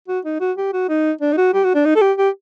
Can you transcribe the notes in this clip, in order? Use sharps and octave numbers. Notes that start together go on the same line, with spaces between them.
F#4
D#4
F#4
G4
F#4
D#4
D4
D#4
F#4
G4
F#4
D4
D#4
A4
G4
G4